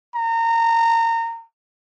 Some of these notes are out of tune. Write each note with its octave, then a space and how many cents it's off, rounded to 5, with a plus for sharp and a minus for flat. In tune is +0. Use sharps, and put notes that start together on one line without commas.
A#5 -25